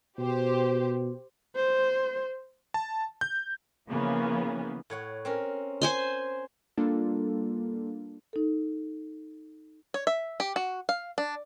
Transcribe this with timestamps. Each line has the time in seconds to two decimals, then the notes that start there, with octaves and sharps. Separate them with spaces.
0.19 B2 G4 C5
1.56 C5
2.74 A5
3.21 G6
3.88 C#3 E3 F3 A#3 B3 C#4
4.90 A2 C#5 F#5
5.25 C4 C#4 A#4
5.82 C5 G#5 C6
6.77 G3 A#3 D4 F4 A4
8.33 D#4 A4
9.94 C#5
10.07 E5
10.40 G4
10.56 F#4
10.89 F5
11.18 D4